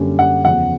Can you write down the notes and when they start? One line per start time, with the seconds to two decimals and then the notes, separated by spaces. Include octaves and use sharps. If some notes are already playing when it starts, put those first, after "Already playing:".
Already playing: F#2 D3 G3 A#3 C#4
0.19 F#5
0.45 E2 C#3 F3 F#5